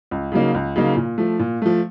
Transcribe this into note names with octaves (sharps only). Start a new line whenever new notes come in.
C#2
C#3 F#3 A#3 D#4
C#2
C#3 F#3 A#3 D#4
A#2
F3 A3
A#2
F3 A3